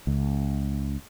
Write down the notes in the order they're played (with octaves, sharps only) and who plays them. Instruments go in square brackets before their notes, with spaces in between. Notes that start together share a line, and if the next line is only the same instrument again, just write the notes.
[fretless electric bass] C#2